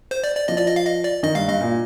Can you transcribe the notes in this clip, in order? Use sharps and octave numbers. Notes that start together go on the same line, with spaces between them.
C5
D5
D5
F3 D#5
D5
D#5
F5
D#5
D5
D#3 D#5
G2 F5
G2 D#5
A#2